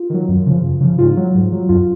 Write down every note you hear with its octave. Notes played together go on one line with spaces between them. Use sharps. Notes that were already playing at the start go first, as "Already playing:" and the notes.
Already playing: F4
D#3 F#3
F#2
C#3 F3
F#2
C#3 F3
G#2 F4
F#3
G#2
F#3
F#2 F4